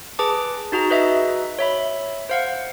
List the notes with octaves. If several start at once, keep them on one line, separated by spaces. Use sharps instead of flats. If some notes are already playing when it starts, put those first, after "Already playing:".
G#4 B4 A5 D6
D#4 F#4 G#4 A#5
F#4 B4 D#5 E5
C#5 E5 B5
C5 F5 F#5